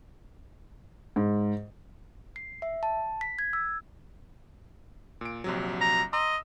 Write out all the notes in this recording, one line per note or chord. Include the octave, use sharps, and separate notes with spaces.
G#2
C7
E5
A5
B6
G#6
E6
A#2 D7
A#1 C3 F#3
A#5
D#5 A#5 C6 E6